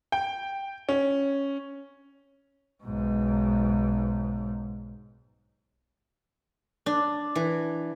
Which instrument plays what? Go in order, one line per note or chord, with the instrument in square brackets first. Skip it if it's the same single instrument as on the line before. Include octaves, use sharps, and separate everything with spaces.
[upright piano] G5
C#4
[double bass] B1 G#2
[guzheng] D4
E3